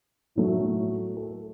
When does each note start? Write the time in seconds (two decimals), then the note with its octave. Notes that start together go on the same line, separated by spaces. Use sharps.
0.36 A2 F#3 A3
1.17 A4